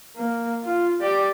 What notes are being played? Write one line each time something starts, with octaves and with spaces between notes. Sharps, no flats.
A#3
F4
G4 D5